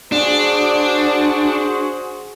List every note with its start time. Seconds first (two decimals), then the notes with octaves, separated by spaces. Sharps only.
0.12 D4 F#4 G#4 C5